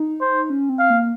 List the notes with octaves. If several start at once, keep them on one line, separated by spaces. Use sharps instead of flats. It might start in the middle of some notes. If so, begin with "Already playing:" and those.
Already playing: D#4
C5
C#4
C4
F5
A#3